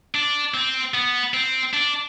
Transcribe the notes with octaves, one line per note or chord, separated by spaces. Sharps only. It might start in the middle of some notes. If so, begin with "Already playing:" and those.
D4
C4
B3
C4
D4